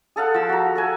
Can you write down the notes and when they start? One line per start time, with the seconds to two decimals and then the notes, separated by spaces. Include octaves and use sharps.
0.16 G#4 A4 F5 F#5
0.34 F3 E6
0.49 F#4 A#5
0.75 A4 F#5 G#5